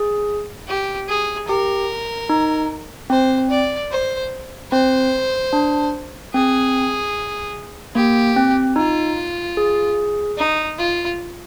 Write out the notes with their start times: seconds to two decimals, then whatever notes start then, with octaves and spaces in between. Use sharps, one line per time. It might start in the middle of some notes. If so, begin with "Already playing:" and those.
Already playing: G#4
0.68 G4
1.09 G#4
1.48 G4 A#4
2.29 D#4
3.10 C4 C5
3.50 D5
3.91 C5
4.72 C4 C5
5.53 D4
6.34 C4 G#4
7.95 A#3 G4
8.37 C4
8.76 D#4 F4
9.57 G#4
10.38 D#4
10.78 F4